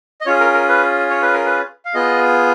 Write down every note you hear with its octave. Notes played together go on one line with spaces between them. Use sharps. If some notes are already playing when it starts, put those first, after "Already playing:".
D#5
C#4 F4 G#4 C#5
A#4
A#4
B4
C#5
B4
A#4
B4
F5
B3 F4 G#4 D#5